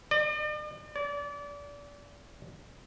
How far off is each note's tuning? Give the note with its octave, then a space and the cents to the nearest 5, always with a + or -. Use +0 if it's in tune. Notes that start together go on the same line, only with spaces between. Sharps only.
D5 +45
D5 -30